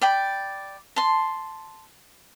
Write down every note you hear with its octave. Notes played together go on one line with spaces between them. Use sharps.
D5 G5 B5
A5 C6